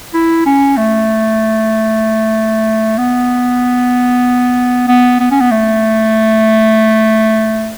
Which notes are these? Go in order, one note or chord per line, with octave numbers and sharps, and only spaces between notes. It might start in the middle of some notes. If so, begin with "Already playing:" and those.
E4
C#4
A3
B3
B3
B3
C#4
B3
A3